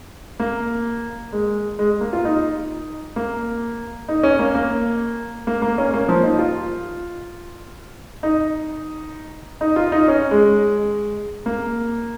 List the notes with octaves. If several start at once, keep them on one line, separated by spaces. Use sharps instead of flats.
A#3
G#3
G#3
A#3
F4
D#4
A#3
D#4
C#4
A#3
A#3
A#3
A#3
C#4
A#3
F3
D#4
F4
D#4
D#4
F4
D#4
C#4
G#3
A#3